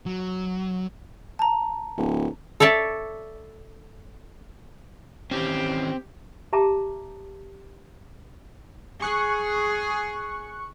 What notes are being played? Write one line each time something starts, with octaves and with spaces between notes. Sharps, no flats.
F#3
A5 A#5
D1
A4 C#5 D5 E5 A5
D#3 E3 C4 C#4 G4
G4 E5 A5 A#5 D6
G#4 C#6 F#6 C#7